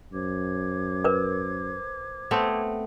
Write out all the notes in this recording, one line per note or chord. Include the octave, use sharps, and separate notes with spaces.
F#2 C5 D6 G#6
A#4 B4
A3 B3 C4